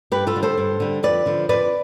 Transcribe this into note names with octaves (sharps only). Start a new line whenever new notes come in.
G2 G4 B4
F4 A4
D3 G3
A4 C5
G2
D3 G3
F2 B4 D5
D3 F3
F2 B4 D5